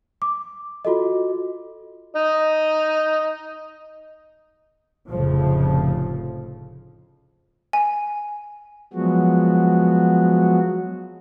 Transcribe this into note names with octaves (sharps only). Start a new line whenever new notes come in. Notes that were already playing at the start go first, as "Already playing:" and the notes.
D6
F4 F#4 A4 D#5
D#4 D#5
F1 F2 A2 C#3 F3
G#5
F3 F#3 G#3 B3 F#4